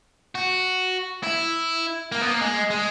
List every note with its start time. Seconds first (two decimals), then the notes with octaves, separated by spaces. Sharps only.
0.35 F#4
1.23 E4
2.12 A#3
2.21 B3
2.30 A#3
2.41 G#3
2.70 G#3